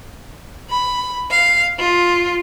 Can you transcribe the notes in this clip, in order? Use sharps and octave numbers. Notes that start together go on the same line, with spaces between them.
B5
F5
F4